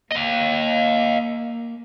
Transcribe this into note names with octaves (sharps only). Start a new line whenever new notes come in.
A#3 D#5 F5